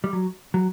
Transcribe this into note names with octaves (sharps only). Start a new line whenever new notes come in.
G3
F#3
F#3